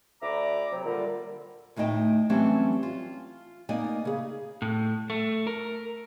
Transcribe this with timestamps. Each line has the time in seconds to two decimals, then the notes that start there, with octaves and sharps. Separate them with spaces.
0.22 D2 D5 E5 A#5 B5 D6
0.72 C3 F#3
0.86 A#2 D3 G3
1.76 D2 A2 D#4 D#5 G5 A5
2.29 E3 F#3 G3 A3 C4 C#4
2.83 F4
3.69 A#3 B3 D#4 D5 D#5 G#5
4.05 C#3 G#4
4.62 A2
5.10 A3
5.47 A#4